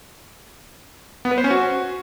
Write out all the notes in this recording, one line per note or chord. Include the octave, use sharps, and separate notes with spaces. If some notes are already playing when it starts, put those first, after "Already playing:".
B3
B4
C5
C#4
F#4